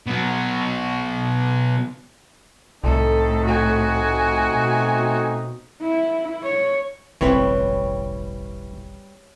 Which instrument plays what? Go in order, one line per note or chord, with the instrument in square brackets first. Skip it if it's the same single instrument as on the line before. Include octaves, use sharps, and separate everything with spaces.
[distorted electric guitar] B2 F#3
[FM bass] C2 [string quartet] A2 [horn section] A3 C4 D#4 [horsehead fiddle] A4
[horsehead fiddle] F#4 G#5
[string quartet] B2
[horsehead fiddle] E4
C#5
[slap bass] E1 A1 D2 [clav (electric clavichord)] E3 [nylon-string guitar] G3 C4 B4 [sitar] C#5